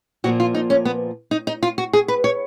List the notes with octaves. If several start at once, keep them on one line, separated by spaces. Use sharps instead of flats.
A#2 F3 A#3 F#4
F4
D#4
C#4
B3
D#4
D#4
F4
F#4
G#4
B4
C#5